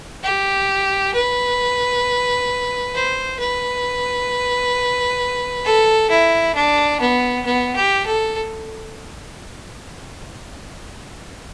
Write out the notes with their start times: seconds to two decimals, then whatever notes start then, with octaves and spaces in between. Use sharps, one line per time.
0.24 G4
1.14 B4
2.94 C5
3.39 B4
5.65 A4
6.10 E4
6.55 D4
7.00 B3
7.45 B3
7.76 G4
8.06 A4